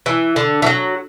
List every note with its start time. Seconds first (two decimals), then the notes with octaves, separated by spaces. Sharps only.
0.06 E3
0.36 D3
0.62 E3
0.66 F#3